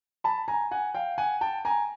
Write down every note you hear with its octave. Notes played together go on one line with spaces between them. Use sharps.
A5 B5
G#5 A#5
F#5 G#5
F5 G5
F#5 G#5
G5 A5
G#5 A#5